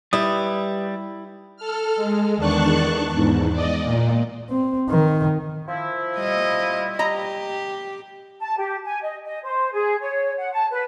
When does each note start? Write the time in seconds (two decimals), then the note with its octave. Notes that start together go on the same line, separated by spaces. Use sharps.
0.13 G3 E4 G4 B4 D#6
1.57 A4 F6
1.96 G#3
2.37 E2 D#3 D4 A5 C#6 F#6
3.10 E2 G#2
3.53 D5 D#5
3.84 A#2
4.50 C4
4.89 D#3
5.68 F3 E4
6.18 G3 D#5
6.99 G4 D#5 A#5
8.40 A5
8.57 G4
8.85 G#5
9.03 D#5
9.24 D#5
9.44 C5
9.73 G#4
10.01 C#5
10.37 F#5
10.52 A5
10.71 B4